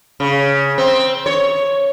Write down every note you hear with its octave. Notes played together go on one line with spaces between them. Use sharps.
C#3
C4
C#5